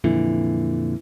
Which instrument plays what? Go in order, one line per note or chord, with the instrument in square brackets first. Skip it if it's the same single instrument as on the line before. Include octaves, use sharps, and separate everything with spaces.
[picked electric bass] F2 A#2 D3 [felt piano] E3